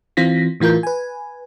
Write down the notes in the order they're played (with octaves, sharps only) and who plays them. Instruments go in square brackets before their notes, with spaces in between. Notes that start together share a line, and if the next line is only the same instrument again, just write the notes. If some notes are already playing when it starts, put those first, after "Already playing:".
[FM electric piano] E3 C4 F4 A#6 B6
A2 E3 F4 A#4 G6
B4 G#5